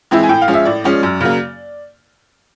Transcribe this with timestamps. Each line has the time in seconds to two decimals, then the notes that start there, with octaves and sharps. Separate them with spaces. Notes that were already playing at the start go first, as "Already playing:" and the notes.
0.11 E3 G#3 C4 E4
0.23 G#5
0.29 A2 G5
0.42 F5
0.48 F3 G#3 C#4
0.54 E5
0.65 A2 D5
0.84 F3 G#3 C#4
1.03 F#2
1.21 C#3 F#3 A#3